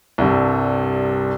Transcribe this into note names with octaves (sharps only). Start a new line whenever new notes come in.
C2 G2 C3